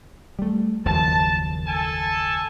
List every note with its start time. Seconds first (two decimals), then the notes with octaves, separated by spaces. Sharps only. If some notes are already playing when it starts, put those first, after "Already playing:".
0.39 G3 A3
0.86 F#1 D#2 F3 A5
1.67 A4 G#5 A5